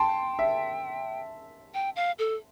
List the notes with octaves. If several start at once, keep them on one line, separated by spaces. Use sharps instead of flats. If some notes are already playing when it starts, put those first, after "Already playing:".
Already playing: G5 A5 C6
E5
G5
F5
A4